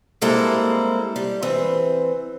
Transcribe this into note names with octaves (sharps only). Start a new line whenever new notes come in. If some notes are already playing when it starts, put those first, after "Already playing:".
G3 G#3 A#3 C4 E4 A4
G3
E3 C4